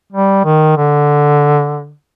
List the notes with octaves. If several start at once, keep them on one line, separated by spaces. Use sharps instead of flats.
G3
D#3
D3